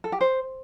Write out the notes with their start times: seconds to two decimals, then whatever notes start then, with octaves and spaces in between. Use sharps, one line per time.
0.04 A4
0.12 G4
0.21 C5